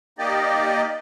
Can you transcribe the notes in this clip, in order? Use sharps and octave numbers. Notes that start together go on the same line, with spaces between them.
A#3 D#4 G4 D5 D#5